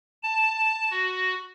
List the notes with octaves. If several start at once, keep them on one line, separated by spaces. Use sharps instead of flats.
A5
F#4